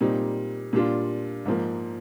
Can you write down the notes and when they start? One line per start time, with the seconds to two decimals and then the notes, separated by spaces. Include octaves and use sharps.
0.01 A#2 G3 C4 D#4
0.73 A#2 G3 D4 F4
1.46 G#2 F3 A#3